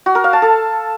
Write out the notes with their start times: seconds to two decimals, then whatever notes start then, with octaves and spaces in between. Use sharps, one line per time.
0.06 F#4
0.15 A#4
0.24 F5
0.33 A5
0.42 A4